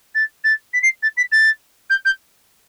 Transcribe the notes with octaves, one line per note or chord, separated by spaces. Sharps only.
A6
A6
B6
C7
A6
B6
A6
G6
G6